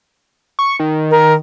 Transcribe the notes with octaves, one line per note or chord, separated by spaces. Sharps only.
C#6
D#3
A#4